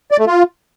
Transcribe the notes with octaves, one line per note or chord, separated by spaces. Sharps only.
D5
A3
F4